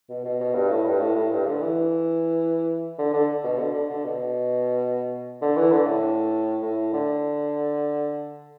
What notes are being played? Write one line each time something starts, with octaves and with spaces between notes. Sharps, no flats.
B2
B2
B2
G2
A2
G2
A2
A2
G2
D3
E3
D3
D3
B2
D3
D3
D3
B2
D3
E3
D3
A2
A2
D3